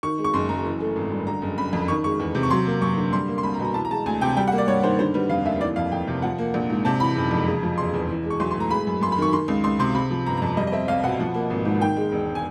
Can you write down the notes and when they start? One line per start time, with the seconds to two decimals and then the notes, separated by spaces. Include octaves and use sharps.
0.03 D#3 C#6
0.18 G#3
0.24 C#6
0.34 F#1 C6
0.49 F#2 A#5
0.65 E3
0.80 A3
0.96 G#1
1.11 G2
1.26 D3 A#5
1.42 F#1
1.58 F#1 B5
1.73 F2
1.88 D#3 C#6
2.04 G#3 C#6
2.19 E2
2.35 C3
2.43 C#6
2.50 F#3 C6
2.66 A#3
2.81 F#2 C#6
2.97 D3
3.12 G3 C6
3.28 A#3
3.38 C6
3.43 C2 B5
3.54 A#5
3.59 B2
3.65 A#5
3.74 E3 A5
3.85 A#5
3.90 G#3 A5
4.06 D2 G#5
4.21 C3 G5
4.37 G3 G5
4.48 F#5
4.52 A#3
4.58 D5
4.68 G2 C#5
4.83 D#3 C5
4.99 D3 C5
5.14 G3 B4
5.30 F1 F5
5.45 D#2 E5
5.61 E3 D5
5.76 F2 F5
5.92 F2 G5
6.07 C3
6.22 F3 F#5
6.38 A#3
6.54 A#1
6.70 G#2
6.85 C3 A5
7.00 E3 B5
7.16 F#1
7.31 F2
7.47 C#3
7.63 F3
7.78 E1 C6
7.94 E2
8.10 E3
8.25 G#3
8.30 C#6
8.40 B1 C6
8.51 C6
8.55 A2
8.60 A#5
8.71 G#3 B5
8.87 F#2
9.01 F#2 C6
9.12 B5
9.18 D#3 C#6
9.33 D#3 C6
9.48 C#2
9.64 C#2 C6
9.79 C3 C6
9.95 C3 B5
10.10 F3
10.26 G1 A#5
10.37 A#5
10.42 F2 A5
10.57 G3 D#5
10.67 D#5
10.72 C4 E5
10.88 C2 F5
11.03 B2 F#5
11.20 F3
11.34 A#3
11.50 G#1
11.65 G#2
11.81 D#3 G5
11.97 G#3
12.12 E1
12.35 G#5